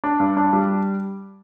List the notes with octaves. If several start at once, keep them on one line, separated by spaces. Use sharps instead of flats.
D4
G2
D4
G3